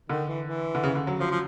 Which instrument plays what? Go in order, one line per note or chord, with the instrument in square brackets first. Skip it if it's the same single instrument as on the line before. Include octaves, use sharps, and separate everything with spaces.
[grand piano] D3 [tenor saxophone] D#3
[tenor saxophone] E3
E3
[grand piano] D3
C#3
D3
F#3
[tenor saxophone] F3 [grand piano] F#3
[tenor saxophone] F3